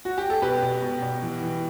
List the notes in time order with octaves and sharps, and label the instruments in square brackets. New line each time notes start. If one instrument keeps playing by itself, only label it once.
[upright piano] F#4
G4
A4
B2 G4 B4
B2
B2
B2
E3
E3